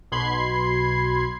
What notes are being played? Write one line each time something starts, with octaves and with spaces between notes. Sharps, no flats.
B1 B2 B5 C6 G#6 C7